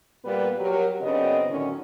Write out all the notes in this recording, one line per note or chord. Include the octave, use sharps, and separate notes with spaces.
A#2 G3 B3 B4
F#3 G4 A#4
F#2 C#3 B3 C4 D4 D#5
A2 D3 D#3 F#3 C#4